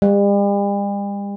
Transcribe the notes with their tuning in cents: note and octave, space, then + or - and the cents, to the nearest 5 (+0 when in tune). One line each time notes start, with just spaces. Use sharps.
G3 +45